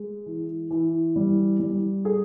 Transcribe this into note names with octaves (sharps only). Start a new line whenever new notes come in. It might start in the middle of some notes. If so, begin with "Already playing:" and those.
Already playing: G#3
E3
E3
G3
G3
G#4